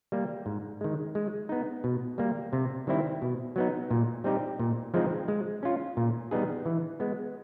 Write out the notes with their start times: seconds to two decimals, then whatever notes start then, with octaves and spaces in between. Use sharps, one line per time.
0.12 G3 A#3
0.46 G#2
0.81 D#3 G#3
1.15 G#3
1.49 B3 D#4
1.84 B2
2.18 G3 A#3
2.53 C3
2.87 D#3 G3 C4 E4
3.22 B2
3.56 F#3 B3 D#4
3.91 A#2
4.24 G3 C4 D#4 G4
4.60 A#2
4.94 F3 G#3 C4 D#4
5.28 G#3
5.63 C#4 F4
5.97 A#2
6.31 G3 B3 D#4 G#4
6.66 E3
7.00 G#3 B3